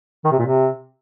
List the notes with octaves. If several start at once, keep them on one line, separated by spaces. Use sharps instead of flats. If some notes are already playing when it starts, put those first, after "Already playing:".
D#3
C3
A#2
C3